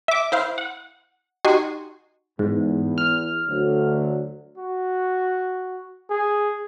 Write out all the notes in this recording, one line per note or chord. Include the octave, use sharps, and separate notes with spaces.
E5 D6
E4 C5 F5
F#5
D#4 F#4 G4 G#5 C6 C#6
E2 G#2
F6
D2 D3 F#3
F#4
G#4